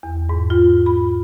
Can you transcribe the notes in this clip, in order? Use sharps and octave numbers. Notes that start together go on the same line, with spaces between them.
E2
G#2
F4
B5